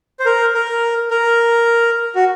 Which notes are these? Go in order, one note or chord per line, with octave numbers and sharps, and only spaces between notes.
C5
A#4
A#4
A#4
F#4